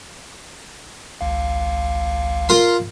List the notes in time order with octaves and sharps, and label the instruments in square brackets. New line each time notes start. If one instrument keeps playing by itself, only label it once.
[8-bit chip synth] G#1 C#2 F5
[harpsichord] F4 A#4 C6